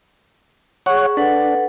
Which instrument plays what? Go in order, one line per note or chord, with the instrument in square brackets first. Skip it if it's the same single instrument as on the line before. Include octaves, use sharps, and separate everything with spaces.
[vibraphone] G#4 C#6 [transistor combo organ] C#5 F#5
[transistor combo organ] D4 [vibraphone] A4 B4 F#5